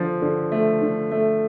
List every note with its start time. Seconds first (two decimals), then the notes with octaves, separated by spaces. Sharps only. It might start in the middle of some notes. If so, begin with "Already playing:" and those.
Already playing: D3 F3
0.22 D3
0.52 A3
0.82 D3
1.11 A3